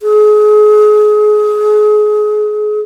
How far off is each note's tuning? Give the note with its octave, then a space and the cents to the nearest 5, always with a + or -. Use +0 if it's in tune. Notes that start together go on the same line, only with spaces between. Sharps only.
G#4 +30